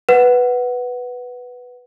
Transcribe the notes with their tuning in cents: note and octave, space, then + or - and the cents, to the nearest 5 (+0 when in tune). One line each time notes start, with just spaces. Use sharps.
B4 +0 F#5 +0